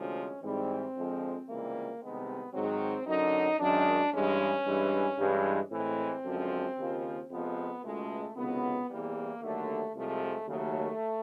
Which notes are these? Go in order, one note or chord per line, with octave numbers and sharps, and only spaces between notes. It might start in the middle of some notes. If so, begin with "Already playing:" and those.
Already playing: D2 C3 F3 G#3 C#4
G#2 E3 G3 C4
F2 D3 F3 G#3
C#2 C3 E3 G3 A#3
C2 C3 D#3 G#3 B3
G#2 D#3 F#3 C4
F#2 D3 F#3 D#4
F#2 D#3 G#3 D4
G2 E3 G#3 C#4
G2 E3 G#3
G2 E3 G#3
A2 E3 G#3 C4
F#2 D3 F3 G#3
D#2 C#3 F3
F2 C3 F3 G#3 B3
C#2 B2 G#3 A3
C#2 C3 D#3 F#3 B3
E2 C3 E3 G3 A#3
D#2 D3 F#3 A3
C2 C3 F3 G#3 A3
D#2 C#3 F#3 A3